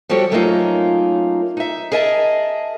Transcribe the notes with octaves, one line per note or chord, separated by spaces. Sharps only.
F3 G3 F#4 G4 A4 C#5
F#3 A3 A#3 C#4 D#4 F4
D#4 E5
G#4 A#4 D#5 E5 G#5 A5